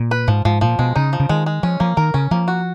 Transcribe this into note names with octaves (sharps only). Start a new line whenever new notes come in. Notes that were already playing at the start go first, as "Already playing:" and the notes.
Already playing: A#2
B4
G#2 F3
G#2 F3
A#2 F3
B2 G#3
C#3 D#4
F3
C#3
D#3 G#3
G#3
F3 C#4
F3 A#3
D#3 A#4
C#3 C#4
F3 A#3
F#4